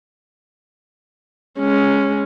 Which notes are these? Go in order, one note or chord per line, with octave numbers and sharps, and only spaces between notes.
G#3 C#4